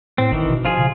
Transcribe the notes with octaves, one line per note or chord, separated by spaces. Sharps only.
A2 C4
G#1 D#3 E3
B2
F3 F4 G#4
C#3